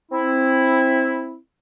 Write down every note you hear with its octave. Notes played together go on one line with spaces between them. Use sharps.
C4 E4